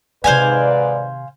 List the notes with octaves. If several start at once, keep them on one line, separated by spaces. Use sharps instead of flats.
G#2 C3 D#3 B4 C5 D5 F5 G#5